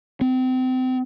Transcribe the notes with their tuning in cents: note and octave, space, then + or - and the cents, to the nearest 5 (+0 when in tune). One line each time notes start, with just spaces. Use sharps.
C4 -30